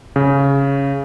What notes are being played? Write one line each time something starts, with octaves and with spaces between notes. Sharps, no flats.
C#3